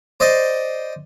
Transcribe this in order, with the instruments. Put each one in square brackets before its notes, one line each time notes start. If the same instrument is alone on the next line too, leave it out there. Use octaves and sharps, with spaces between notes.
[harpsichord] C5 D5 D#5